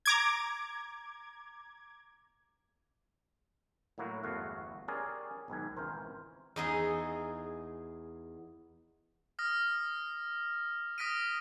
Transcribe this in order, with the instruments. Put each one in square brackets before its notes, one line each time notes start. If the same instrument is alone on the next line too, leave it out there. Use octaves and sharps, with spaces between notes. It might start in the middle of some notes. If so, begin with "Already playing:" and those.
[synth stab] A#5 D6 G#6
[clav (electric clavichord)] A2 F#3 A#3 E4 F#4
G1 E2 A3 F#4 F5
C#4 G4 G#4 A#4 C5 D5
B1 G#2 D#3 G#5
G#1 C#2 E3 A#4 C5
[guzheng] E2 D#4 G#4
[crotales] D#6 F6 A#6
D#6 F6 A#6 B6 D7 D#7